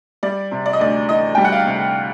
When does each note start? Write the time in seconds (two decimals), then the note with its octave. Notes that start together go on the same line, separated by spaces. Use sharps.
0.23 G3 D5
0.51 C3
0.66 D5
0.73 D#5
0.80 D2 D5
1.09 E3 D#5
1.35 G3 G5
1.44 F#5
1.52 F5
1.66 C3